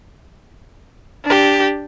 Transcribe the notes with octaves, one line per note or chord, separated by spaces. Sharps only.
D4 G4